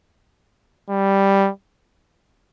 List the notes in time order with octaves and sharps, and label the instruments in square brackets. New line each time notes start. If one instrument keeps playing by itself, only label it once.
[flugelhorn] G3